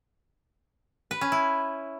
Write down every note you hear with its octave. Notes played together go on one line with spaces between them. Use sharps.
B4
C#4
E4